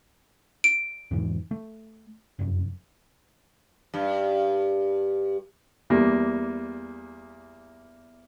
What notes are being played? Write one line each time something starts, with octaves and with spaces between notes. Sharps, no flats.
D7
E2 G#2 E3
A3
F1 F#2
G2
E2 G3 A#3